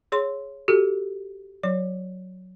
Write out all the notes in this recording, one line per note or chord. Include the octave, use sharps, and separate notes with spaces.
G#4 C#5 C6
F#4 G4 A4
F#3 C#5